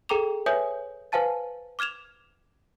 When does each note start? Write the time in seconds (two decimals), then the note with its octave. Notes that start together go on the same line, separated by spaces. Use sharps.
0.09 G#4 A4 G5 A#5 D6 F7
0.46 B4 C#5 E5 G#5 D#6 G6
1.12 B4 C5 F5 G#5 A5 A6
1.79 D6 F6 G#6 E7 F7